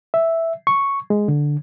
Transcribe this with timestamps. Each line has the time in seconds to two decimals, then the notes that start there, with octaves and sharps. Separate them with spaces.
0.14 E5
0.67 C#6
1.10 G#3
1.28 D3